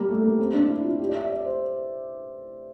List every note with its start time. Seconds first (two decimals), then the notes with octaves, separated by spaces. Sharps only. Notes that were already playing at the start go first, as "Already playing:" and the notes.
Already playing: G3 A#3
0.09 A3
0.23 A#3
0.39 C4
0.54 D4
0.70 E4
0.84 F4
0.99 G4
1.09 D5
1.15 E5
1.30 D5
1.45 C5